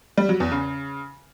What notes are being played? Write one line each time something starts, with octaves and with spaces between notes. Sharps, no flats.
G3
F#3
E2
C#3